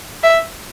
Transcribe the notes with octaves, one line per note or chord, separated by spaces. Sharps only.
E5